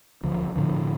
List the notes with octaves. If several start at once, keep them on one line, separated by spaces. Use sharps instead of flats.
D2 C#3 F3
A2 D3 F3